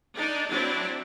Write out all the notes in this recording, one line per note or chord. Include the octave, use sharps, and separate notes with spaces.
D4 D#4
F#3 C4 D4 E4